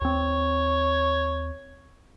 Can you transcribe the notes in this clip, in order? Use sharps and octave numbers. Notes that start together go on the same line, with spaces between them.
D#2 C4 C#5